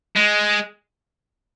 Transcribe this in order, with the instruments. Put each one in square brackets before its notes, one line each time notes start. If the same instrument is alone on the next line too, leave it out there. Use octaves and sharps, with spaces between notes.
[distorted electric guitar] G#3